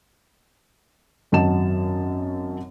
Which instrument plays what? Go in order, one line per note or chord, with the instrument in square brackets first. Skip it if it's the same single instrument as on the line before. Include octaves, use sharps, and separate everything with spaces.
[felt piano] G#1 F#2 F#3 D#5 A5 E7